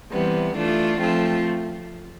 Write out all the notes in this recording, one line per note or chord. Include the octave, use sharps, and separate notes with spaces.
C3 E3 G3 B3
E3 A3 D4 F4
F3 A3 C4 F4